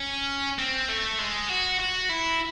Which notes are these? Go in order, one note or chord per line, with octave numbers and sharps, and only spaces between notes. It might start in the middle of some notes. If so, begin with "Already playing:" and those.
Already playing: C#4
C4
A3
G#3
F#4
F#4
E4